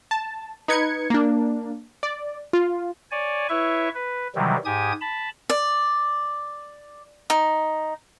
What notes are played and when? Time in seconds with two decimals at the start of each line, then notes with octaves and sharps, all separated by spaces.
0.11 A5
0.68 D#4 B4 G#6 C#7
1.10 A#3 D4
2.03 D5
2.53 F4
3.11 C#5 D5 G#5
3.49 E4 B4 C#5 E5 C#6
3.95 B4
4.35 C3 D#3 E3 F#3 G3
4.65 G#2 G4 G#5 D#6 G#6
5.01 A5 B5
5.50 D5
7.30 D#4